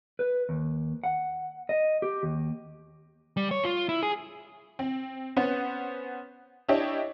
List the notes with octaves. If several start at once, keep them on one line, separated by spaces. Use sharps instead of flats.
B4
D#2
F#5
D#5
G4
D#2
G3
C#5
F4
E4
G#4
C4
B3 C#4 C5 F#5
D4 E4 G4 C#5 D#5 E5